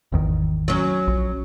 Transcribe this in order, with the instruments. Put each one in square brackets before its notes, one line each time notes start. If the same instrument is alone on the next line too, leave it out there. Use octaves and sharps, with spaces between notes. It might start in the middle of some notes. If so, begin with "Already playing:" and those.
[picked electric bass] G#1 E2 D#3
[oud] F#3 C#4
[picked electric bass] A#1